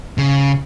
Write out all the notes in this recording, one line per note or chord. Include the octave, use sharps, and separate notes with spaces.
C#3